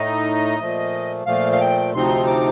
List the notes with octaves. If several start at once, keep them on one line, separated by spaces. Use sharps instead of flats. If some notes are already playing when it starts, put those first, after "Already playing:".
Already playing: A2 A3 D#4 D#5
A#2 F3 A3
A#2 F3 A3 F5
F5
G5
D2 C3 F3 C4 D#4 C6
D6